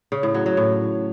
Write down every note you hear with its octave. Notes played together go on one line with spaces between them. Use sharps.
C#3
A2
F#3
F#3
A2